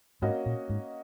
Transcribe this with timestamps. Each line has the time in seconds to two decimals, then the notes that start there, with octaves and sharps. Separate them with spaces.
0.22 G#2 A#3 C#4 F#4 D#5
0.46 A#2
0.69 G#2